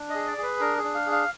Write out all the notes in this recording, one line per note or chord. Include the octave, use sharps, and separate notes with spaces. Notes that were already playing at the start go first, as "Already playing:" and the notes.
Already playing: D4
D#5
G#4
D5
G#4
B4
D4 A#4
G#4
D4
F5
G#4
F5